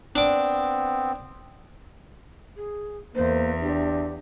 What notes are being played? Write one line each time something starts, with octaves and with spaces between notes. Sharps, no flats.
B3 C4 D4 D6
G#4
E2 A#3 C5
D4 G4